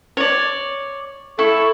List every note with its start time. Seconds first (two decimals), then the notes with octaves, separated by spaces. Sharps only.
0.17 C#5 D5
1.39 E4 A4 C#6